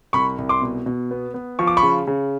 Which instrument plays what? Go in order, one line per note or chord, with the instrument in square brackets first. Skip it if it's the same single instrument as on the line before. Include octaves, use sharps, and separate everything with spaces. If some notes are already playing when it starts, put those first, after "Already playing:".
[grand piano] C2 B5 C#6
C2
C6 D6
B2
B2
B3
B3
F3 C#6
D6
B5 C#6
C#3
C#3